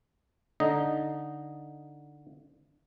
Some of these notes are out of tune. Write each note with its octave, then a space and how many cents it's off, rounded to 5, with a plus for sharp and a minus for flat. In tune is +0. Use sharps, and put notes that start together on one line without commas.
D3 +0 D#4 +0 D#5 -5